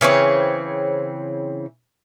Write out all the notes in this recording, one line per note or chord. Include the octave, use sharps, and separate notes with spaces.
C#3 E3 C4 C#5